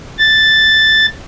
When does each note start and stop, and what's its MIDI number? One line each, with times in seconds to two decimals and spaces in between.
0.18 1.06 93